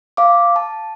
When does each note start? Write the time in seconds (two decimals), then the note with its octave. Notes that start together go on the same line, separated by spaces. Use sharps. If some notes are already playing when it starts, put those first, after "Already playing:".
0.17 F5 D6
0.56 A5